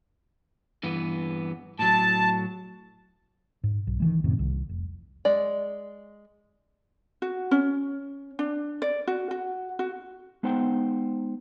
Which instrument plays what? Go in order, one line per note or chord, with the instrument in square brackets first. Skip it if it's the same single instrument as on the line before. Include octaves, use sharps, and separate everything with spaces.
[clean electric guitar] G2 E3 B3
[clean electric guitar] A2 F#3 [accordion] A5
[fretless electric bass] G#2
B1
D#3 E3 G#3
F#2 A2 C3 D#3
C2
F1
[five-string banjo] G#3 D5
[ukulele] F#4
C#4
D4
D5
F#4
F#4
F#4
[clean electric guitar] G#3 B3 D#4 C5 F#5 G5